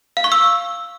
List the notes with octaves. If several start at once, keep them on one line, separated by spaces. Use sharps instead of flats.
F5
C#6
E6